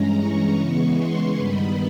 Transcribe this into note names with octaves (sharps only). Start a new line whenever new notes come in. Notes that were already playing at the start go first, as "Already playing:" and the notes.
Already playing: G2 E3 G#3 C#4 A#5
C#6
C#3 E3 G#3 B3 C#6
C6
G2 D#3 G3 B3 D#4 B5